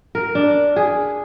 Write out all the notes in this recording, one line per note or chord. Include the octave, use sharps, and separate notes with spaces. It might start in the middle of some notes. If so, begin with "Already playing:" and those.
A#4
D4
G#4